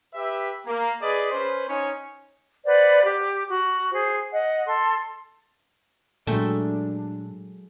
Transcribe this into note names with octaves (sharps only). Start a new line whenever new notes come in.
G4 B4 E5
A#3
G#4 B4 D5 D#5
C#4 B4 C5
C#4 D#4 C#5 G#5
B4 C5 D5 F#5
G4
F#4
G#4 C5
D#5 F#5
A4 C6
A#2 F#3 G#3 A3 D4 E5 G5